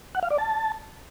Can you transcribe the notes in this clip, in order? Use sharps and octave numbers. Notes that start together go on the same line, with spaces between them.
F#5
F5
D5
A5